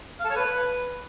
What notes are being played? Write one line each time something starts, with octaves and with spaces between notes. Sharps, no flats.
F5
A4
C#5
B4